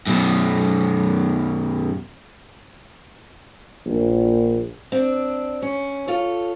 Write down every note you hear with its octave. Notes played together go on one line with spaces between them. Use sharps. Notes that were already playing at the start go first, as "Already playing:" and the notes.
F#2 B2
A#1
C4 D4
C#4
F4 A4 C#5